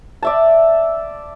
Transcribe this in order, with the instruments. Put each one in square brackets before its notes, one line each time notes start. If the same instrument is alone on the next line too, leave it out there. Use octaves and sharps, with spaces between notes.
[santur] D5 E5 A5